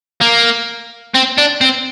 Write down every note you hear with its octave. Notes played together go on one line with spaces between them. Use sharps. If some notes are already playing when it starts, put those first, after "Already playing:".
A#3
C4
D4
C4